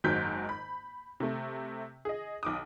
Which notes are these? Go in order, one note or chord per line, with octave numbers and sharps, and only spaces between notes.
F#1 G#2 D#3 F#3 G6 B6
B5
C3 A3
G#4 D#5
B1 D6 D#6